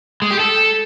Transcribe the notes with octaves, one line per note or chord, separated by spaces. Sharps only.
G#3
G4
A4